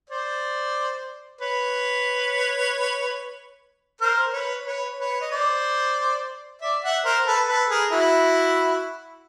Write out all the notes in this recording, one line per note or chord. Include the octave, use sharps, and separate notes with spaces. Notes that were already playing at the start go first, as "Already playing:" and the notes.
C5 D5
B4 C#5
A#4 C5
B4 C#5
B4 C#5
B4 C#5
D#5
C5 D5
D5 E5
E5 F#5
A#4 C5
A4 B4
A4 B4
G#4 A#4
E4 F#4